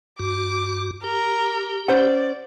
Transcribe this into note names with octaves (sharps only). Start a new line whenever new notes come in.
G2 F#4 D6
G4 A#4
C#4 C5 D5 F#5